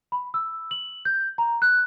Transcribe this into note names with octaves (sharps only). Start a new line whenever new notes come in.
B5
E6
F#7
G6
A#5
F#6